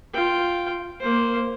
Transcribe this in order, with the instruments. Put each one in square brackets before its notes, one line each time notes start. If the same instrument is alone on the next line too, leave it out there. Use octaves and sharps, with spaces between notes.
[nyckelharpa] F4 G5
A#3 C5